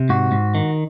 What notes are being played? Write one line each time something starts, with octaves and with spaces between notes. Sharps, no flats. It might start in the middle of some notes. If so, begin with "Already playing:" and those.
Already playing: C3
G#2 F#4
G#2
D#3